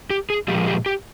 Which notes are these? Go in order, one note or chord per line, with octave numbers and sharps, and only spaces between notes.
G4
G#4
A#2 F3 G#3 G4
G4
G4